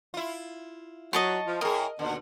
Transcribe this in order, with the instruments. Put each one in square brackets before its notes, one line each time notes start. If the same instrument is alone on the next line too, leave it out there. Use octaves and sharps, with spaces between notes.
[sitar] E4 F4
[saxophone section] F#3 [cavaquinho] D#5 A5 C#6
[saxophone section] F3
[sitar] A2 G#4 [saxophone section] A#4 [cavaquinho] D#5
[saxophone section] D#2 B2 [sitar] D3